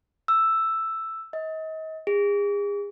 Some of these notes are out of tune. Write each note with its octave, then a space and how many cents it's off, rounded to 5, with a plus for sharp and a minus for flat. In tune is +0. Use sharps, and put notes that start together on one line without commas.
E6 +5
D#5 +35
G#4 -35